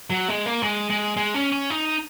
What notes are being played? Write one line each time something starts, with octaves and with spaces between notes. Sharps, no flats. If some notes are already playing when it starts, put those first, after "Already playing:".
F#3
G#3
A#3
G#3
G#3
G#3
C#4
C#4
D#4